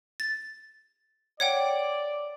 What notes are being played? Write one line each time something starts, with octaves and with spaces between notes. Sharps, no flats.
A6
C#5 D5 F#5 G5